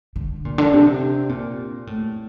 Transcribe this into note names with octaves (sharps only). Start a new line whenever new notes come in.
D3
A#2
D3
C3
A#2
A2